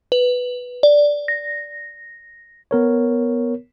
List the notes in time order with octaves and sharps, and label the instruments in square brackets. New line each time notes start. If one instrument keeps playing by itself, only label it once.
[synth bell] B4
D5
A#6
[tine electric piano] B3 A#4 C#5